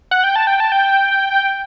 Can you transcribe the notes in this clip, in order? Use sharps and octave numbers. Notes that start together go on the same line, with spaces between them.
F#5
G5
A5
G5
A5
G5